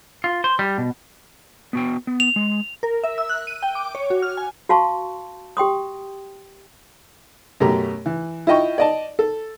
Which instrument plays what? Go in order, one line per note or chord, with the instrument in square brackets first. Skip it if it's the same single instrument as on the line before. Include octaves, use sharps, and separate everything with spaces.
[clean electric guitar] F4
C5
G3
B2
[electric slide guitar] B3 F#4 G5
B3
[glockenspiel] F7
[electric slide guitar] G#3
[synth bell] A#4
E5
E6
F#6
D#7
G5
D6
C#5
F#4
F6
G#5
[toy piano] F#4 F5 A5 C6 C#6
G4 G5 C6 D#6
[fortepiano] F#2 B2 A3 G4 A#5
E3
E4 F4 D#5 G5 C#6
D5 D#5 A5
A4